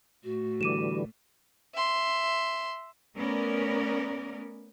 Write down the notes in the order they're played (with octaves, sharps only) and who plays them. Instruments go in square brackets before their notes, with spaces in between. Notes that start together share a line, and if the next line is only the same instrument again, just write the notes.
[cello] A2 A3 [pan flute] F#4
[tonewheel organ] D3 E3 G3 [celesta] D6 D#7 E7
[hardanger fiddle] E5 C6
[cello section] A3 B3 C#4 A#4 D5